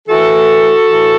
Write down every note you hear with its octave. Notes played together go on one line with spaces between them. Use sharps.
A2 E3 F#4 A4
A2 E3